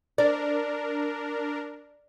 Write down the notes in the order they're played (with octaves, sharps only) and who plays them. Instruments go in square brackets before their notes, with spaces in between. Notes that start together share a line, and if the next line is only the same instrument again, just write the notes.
[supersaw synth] D4 A#4 [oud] D5